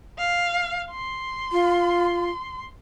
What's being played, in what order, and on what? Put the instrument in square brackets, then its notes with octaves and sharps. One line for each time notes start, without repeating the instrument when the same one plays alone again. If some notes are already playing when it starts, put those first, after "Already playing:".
[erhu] F5
C6
[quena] F4